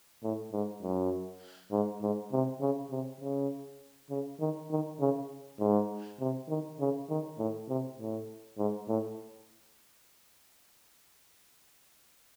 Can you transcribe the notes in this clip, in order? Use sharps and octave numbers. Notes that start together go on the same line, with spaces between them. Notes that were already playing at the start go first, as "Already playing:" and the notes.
A2
G#2
F#2
G#2
G#2
C3
C#3
C3
C#3
C#3
D#3
D#3
C#3
G#2
C3
D#3
C#3
D#3
A2
C3
A2
G#2
A2